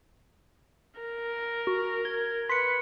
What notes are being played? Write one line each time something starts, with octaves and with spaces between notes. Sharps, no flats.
A#4
F#4
G#6 G7
B4 C6 B6 C#7